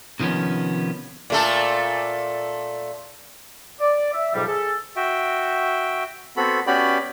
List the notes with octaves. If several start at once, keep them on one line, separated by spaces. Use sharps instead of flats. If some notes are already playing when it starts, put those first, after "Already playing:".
C3 D#3 F3 B3 C#4
A#2 A3 A4
D5
E5
F2 G#2 B2 F#3 G3
G#4 A4
F#4 E5 G5
B3 C4 F#4 A4 B5
B3 C#4 F#4 G4 D5 B5